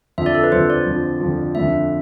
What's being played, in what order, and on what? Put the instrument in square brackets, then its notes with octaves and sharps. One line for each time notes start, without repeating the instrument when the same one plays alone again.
[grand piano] F2 D3 F3 [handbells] E5
[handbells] D5
A4
B4
[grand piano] F2 D3 F3 [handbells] C5
[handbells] D5
[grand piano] F2 D3 F3
F2 D3 F3
[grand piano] F2 D3 F3 A3 D4 [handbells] E5